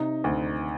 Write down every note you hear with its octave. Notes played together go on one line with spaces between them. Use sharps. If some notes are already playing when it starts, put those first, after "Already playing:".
Already playing: C3 D#4
D2